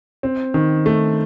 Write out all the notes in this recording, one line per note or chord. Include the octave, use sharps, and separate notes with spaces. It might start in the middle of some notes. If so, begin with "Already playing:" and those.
C4
D#3
A3